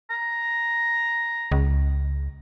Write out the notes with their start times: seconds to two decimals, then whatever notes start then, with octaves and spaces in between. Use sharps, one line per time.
0.10 A#5
1.52 C#2